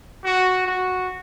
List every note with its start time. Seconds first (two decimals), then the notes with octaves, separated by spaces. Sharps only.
0.25 F#4
0.67 F#4